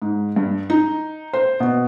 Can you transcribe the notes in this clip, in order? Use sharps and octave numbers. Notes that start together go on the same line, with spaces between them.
G#2
G2
D#4
C5
B2